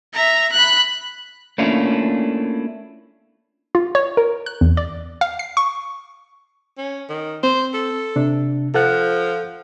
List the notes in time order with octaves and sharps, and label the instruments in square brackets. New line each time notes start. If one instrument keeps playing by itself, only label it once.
[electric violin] E5 A#5
B5 F#6
[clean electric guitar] A3 A#3 C#4 D4 E4 F4
[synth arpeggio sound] F4
C#5
A#4
F#6
E2
D5
F5
C7
C#6
[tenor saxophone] C#4
D#3
[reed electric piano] C4 [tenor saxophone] C5
[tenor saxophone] A4
[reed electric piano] C3 D4
[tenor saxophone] F3 [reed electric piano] A4 F#5 F#6